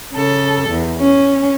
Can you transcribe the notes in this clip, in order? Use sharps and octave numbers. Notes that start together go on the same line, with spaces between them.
C#3 A4
E2
C#4